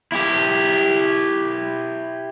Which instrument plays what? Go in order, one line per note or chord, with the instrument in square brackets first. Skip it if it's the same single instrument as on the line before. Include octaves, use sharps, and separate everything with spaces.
[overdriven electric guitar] E4 G4